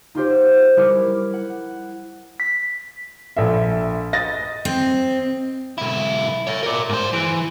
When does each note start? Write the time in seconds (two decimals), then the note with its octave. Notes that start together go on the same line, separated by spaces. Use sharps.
0.15 D#4 F4 G4 C5
0.76 G3 E4 A#4 D6 F6
1.34 F#5
2.40 B6
3.37 A#1 A4 E5
4.13 D#5 A6 A#6
4.65 C4
5.78 B1 E4
6.47 C#5 E5
6.63 A#4 D5
6.89 G#2 C5
7.13 E3